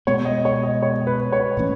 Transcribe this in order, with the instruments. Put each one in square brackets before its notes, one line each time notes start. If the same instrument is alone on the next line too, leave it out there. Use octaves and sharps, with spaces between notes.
[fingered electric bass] B2 G#3 B3 [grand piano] C#5
[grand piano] D#5
C#5
D#5
C#5
B4
C#5
[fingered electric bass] A2 E3 A3 C#4